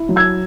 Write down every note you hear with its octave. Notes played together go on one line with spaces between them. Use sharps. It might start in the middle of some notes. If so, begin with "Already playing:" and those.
Already playing: E4
F#3
E6 G#6